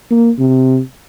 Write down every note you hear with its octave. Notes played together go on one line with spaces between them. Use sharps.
A#3
C3